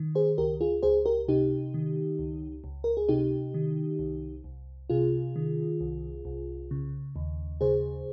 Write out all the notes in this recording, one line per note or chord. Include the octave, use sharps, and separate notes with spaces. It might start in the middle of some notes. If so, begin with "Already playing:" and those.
Already playing: D#3
G#4 C5
C#2 G4 A#4
F4 G#4
C#2 G#4 C5
G4 A#4
C3 D#4 G4
D#3
C#2
C#2
A#4
G#4
C3 D#4 G4
D#3
C2
C2
C3 F4 G#4
D#3
C2
C2
C#3
D#2
C#3 G#4 C5